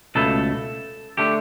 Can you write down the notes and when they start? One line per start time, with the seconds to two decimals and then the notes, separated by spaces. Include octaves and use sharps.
0.15 C#2 B2 A3 A4
1.17 D3 A3 G4